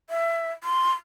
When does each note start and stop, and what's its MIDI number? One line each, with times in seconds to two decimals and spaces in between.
0.10 0.52 76
0.64 0.93 84